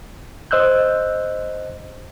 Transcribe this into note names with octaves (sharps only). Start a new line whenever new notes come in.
C5 D#5 E6 F#6 G6